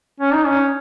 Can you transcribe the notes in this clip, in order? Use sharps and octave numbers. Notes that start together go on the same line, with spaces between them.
C#4
D#4
C#4